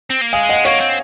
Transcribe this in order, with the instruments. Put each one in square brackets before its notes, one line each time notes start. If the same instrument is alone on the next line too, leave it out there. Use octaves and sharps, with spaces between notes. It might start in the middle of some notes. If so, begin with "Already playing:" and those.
[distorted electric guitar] C4
A#3
[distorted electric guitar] G#3 [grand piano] F5 G#5
[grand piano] D#5 F#5
[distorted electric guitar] A#3 [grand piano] C#5 F5
[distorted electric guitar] C4